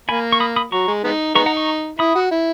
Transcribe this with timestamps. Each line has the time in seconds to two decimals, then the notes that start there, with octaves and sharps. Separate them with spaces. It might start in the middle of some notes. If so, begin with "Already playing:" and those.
0.09 A#3 G#5 B5
0.33 C#6
0.40 B5 D#6
0.56 B5 D#6
0.72 F#3 A#5 C#6
0.87 G#3
1.04 G#3 B3 D#4
1.35 G#3 B3 D#4 A#5 C#6
1.46 F#5 A#5
1.57 A#5 C#6
1.99 E4 B5 D#6
2.15 F#4
2.31 E4